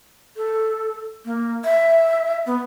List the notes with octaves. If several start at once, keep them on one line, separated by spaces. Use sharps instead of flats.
A4
A#3
E5
B3